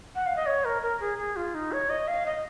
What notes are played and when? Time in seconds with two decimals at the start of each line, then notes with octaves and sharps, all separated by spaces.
0.15 F#5
0.26 F5
0.36 D#5
0.46 C#5
0.65 A#4
0.82 A#4
1.00 G#4
1.18 G#4
1.36 F4
1.54 D#4
1.72 C#5
1.90 D#5
2.08 F5
2.26 D#5